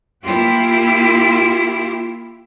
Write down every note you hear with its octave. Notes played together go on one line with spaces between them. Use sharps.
A#3 E4 F4 G4